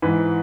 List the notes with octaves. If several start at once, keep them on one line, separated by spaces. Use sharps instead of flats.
G#2 E3 B4